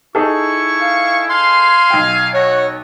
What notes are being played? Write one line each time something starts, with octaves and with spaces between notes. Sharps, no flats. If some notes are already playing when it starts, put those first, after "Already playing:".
D#4 E4 G#4 A4 C#6
F5
F5 G#5 C6
B1 G5
F#4 C#5 F#5